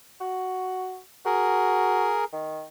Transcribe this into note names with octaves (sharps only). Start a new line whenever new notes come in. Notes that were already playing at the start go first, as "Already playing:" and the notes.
F#4
F#4 G#4 A#4
D#3